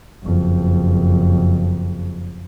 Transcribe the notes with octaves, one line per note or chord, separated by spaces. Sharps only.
F#1 F2